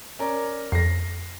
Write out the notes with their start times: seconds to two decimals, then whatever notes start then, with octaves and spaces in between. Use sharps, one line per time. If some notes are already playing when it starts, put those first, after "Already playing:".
0.19 C#4 A#4 D5
0.72 F2 A#6 C7